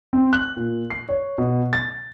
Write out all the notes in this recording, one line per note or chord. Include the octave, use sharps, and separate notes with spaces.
C4
F#6
A#2
C7
C#5
B2
A6